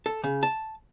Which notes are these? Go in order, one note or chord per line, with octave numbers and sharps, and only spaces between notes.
A4
C#3
A5